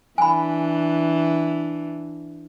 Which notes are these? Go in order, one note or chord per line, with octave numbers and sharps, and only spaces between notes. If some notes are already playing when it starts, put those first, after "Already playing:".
E3 D4 G#5 B5